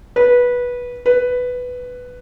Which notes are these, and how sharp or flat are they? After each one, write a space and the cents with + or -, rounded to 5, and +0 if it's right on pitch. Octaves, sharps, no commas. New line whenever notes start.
B4 -15
B4 +5